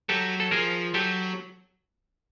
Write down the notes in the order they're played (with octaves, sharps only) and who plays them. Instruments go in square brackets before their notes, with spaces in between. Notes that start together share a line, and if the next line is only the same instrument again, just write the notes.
[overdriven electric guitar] F#3 [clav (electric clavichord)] G4 A4
[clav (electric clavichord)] A4
[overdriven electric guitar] F3 [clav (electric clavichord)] G#4 A#4
[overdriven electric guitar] F#3 [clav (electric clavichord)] G4 A4